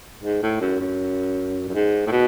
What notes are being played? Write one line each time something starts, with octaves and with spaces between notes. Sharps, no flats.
G#2
A2
F#2
F#2
F#2
G#2
A2
B2